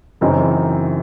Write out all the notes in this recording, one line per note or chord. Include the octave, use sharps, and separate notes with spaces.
F#2 C#3 E3 C4 D#4